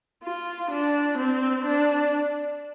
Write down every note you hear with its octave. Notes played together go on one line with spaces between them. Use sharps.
F4
D4
C4
D4